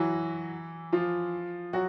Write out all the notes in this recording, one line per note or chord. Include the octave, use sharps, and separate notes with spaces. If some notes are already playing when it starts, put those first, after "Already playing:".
Already playing: E3 F#3 E4 F#4
F3 F4
F#3 F#4